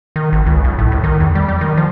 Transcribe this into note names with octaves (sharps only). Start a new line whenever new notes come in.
D#3
G#1
C#2
B1
A2
C2
D#3
E2
G3
G3
D#3
F3